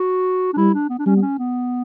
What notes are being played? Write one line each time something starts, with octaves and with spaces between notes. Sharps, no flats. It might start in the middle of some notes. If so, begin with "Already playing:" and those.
Already playing: F#4
D4
G3 E4
D4
B3
D4
G3 C#4
B3
C#4
B3